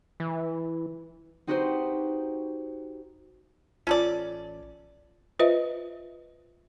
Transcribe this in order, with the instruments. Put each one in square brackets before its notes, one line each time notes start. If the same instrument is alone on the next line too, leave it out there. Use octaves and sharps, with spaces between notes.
[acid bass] E3
[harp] C4 D#4 F#4 G4 B4 C5
[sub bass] A1 [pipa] C#4 A4 D5 [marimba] F4
[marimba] F4 B4 C5 D#5 E5